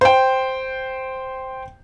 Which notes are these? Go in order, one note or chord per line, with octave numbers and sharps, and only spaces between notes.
C5 G5